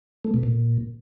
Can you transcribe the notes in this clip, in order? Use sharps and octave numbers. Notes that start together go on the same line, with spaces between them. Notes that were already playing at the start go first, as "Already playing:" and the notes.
A3
B2
A#2